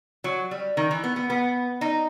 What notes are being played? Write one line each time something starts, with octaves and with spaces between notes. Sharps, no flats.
F#3
G3
D#3
E3
B3
B3
B3
D#4